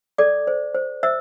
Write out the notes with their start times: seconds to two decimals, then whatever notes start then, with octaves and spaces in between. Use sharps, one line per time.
0.18 A4 D5 D6
0.47 C5
0.75 C5
1.03 C5 E5 E6